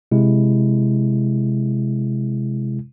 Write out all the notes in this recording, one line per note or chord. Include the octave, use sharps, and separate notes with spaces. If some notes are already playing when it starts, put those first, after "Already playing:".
C3 G#3 E4